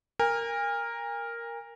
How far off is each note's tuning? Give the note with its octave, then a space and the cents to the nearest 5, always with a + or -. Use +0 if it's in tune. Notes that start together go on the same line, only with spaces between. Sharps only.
A#4 +0 G#5 -40